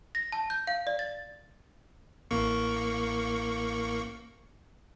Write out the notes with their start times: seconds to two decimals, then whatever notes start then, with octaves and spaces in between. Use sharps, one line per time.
0.15 A#6
0.32 A5
0.50 G6
0.67 F5
0.87 D5
0.99 A6
2.31 A1 A#3 C#6